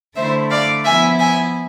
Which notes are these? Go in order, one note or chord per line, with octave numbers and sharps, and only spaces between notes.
D3 A3 E4 C5 E5
D5 F5
F3 B3 E4 E5 G#5
E5 G#5